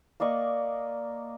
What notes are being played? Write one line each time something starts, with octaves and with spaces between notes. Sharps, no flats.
A#3 D5 D#5 C#6